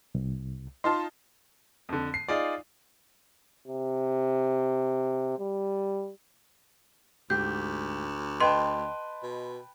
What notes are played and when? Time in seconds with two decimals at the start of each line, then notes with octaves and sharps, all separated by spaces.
0.15 C2
0.84 D#4 F4 A5 C6
1.89 F2 D3
2.14 C7
2.28 D#4 F4 G#4 D5
3.67 C3
5.39 G3
7.30 D2 G#2 G4 G6
8.40 B4 D#5 G5 A5 C6
9.23 B2